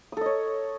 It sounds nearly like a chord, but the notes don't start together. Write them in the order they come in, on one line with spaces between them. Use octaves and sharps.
D#6 A4 D#5 C#5